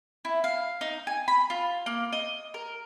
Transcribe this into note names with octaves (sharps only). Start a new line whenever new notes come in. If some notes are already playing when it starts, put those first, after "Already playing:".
E4
F5
D#4
G#5
B5
F4
A#3
D#5
A#4